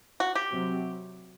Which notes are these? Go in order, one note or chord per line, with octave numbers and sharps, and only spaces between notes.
F#4
G4
C3 F#3 C4